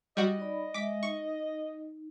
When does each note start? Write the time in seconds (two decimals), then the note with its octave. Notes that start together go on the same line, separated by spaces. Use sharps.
0.17 G3 F#4 D#5
0.38 D#4 D5 B5
0.74 G#3 E5 D6 B6
1.03 D#4 C#6